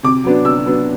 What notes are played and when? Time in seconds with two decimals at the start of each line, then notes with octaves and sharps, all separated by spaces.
0.03 C3 D6
0.24 F#3 B3 D4
0.44 C3 E6
0.65 F#3 B3 D4